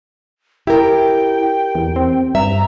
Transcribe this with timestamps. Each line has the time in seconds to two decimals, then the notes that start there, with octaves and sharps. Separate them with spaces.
0.67 E4 G4 A#4 G5
1.75 E2
1.96 C4
2.35 G2 E5 A#5